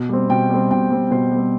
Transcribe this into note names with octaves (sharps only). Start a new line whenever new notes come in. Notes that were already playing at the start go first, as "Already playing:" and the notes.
Already playing: B2
G3 C4
B2 G5
G3 C4
B2 G5
G3 C4
B2 C5
G3
C4